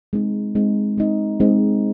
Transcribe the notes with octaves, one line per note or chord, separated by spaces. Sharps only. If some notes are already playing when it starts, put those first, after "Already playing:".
G#3 C4 D#4
G#3 C4 D#4
G#3 C4 D#4
G#3 C4 D#4